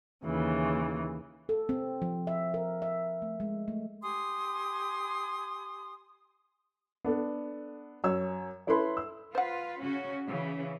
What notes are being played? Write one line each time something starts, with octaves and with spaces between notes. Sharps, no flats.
D#2 C#3 E3
A4
C4
F3
E5
A#4
E5
A3
G#3
A3
G4 G#5 C6 D#6
B3 D4 A4
F#2 C#5 E6
C#4 E4 A4 B4 B5 C6
E6
F4 B4 C5 F#5
C#3 C#4 F#4
C#3 E3